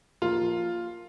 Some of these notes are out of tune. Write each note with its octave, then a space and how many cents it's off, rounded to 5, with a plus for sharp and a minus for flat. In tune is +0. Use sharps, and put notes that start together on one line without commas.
F3 +0 A#3 +0 F4 +0